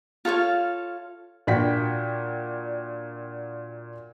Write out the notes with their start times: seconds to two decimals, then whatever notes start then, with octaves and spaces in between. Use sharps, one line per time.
0.25 F4 A4 C#5 F5
1.47 A#2 D4 F#4 D5 G5 B6